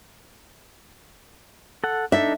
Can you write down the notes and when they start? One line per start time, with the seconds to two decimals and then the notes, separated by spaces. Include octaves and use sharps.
1.84 A4 F#5
2.12 D4 D#4 A4 E5